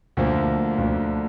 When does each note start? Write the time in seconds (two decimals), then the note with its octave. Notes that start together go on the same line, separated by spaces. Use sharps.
0.17 D2 D3 F3 A#3
0.78 D2 D3 F3 A#3